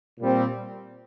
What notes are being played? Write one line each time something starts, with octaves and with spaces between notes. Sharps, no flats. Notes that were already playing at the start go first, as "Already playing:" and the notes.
A#2 G3 C4